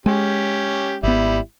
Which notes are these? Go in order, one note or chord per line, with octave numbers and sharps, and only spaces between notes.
G#3 C#4 G4
G#1 G3 B3 E4